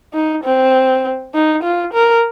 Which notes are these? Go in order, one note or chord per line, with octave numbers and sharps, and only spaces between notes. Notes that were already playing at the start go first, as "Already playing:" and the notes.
D#4
C4
D#4
F4
A#4